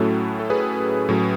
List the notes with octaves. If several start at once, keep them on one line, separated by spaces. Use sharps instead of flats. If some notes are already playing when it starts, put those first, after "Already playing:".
Already playing: A2 F#3 A3 C#4 E4 F#4 A4
A4
G#4 B4
A2 F#3 C#4